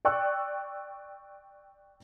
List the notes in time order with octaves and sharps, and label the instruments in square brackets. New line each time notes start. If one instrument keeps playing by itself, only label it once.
[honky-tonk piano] D5 G5 C#6 E6 F#6